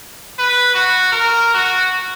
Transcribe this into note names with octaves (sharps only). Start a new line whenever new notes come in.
B4
F#4
A#4
F#4